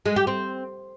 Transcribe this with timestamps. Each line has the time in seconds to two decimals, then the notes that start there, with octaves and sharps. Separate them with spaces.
0.06 G#3
0.16 G4
0.27 C4